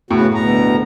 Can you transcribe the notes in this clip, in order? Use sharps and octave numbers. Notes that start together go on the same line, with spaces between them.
A2 C#3 B3 F#4
D2 B2 A#5